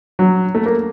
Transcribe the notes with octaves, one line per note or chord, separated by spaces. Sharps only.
F#3
A3
A#3